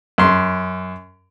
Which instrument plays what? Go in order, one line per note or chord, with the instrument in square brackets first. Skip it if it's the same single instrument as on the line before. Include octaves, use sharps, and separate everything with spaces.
[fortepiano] F#2 C6